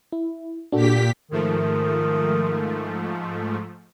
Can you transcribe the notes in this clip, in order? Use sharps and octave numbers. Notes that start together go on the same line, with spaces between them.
E4
A#2 D4 F#4 G4 A4 B6
G#2 D#3 F3 A3